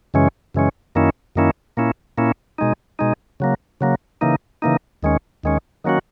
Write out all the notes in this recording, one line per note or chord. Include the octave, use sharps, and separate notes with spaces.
F#2 C#3 E3 G#3 C#4
F#2 C#3 E3 G#3 C#4
F#2 D#3 A#3 C#4 E4
F#2 D#3 A#3 C#4 E4
A#2 A#3 C#4 E4
A#2 A#3 C#4 E4
B2 G#3 D#4
B2 G#3 D#4
C#3 F#3 A#3
C#3 F#3 A#3
C#3 E3 A#3 D#4
C#3 E3 A#3 D#4
D#2 D#3 G#3 C#4
D#2 D#3 G#3 C#4
D#3 F#3 A#3 C#4 F#4